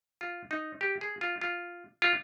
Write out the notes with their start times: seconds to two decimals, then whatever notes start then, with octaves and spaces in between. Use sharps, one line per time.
0.21 F4
0.51 D#4
0.81 G4
1.01 G#4
1.21 F4
1.41 F4
2.02 F4